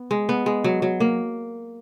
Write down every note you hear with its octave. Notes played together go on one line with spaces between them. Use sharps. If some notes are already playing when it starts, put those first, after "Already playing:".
Already playing: B3
G#3
B3
G#3
F#3
F#3
A#3